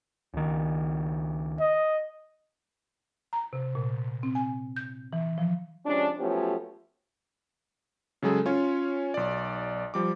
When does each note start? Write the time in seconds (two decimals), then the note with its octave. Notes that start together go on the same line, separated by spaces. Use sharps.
0.34 C#2 D#3
1.60 D#5
3.33 A#5
3.53 C3
3.75 A#2
4.23 C4
4.35 G#5
4.76 G6
5.13 E3
5.38 F3
5.86 C3 F3 G#3 C#4 D4
6.19 F3 F#3 A3 B3 C#4 G4
8.22 C#3 F#3 G#3 G#4 A4
8.46 C#4 F4 C#5
9.14 B1 D5
9.94 F3 G3 D6